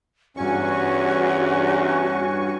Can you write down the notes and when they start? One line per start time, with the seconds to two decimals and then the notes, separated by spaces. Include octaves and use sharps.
0.37 E2 G2 C#4 F#4 G#5 C#6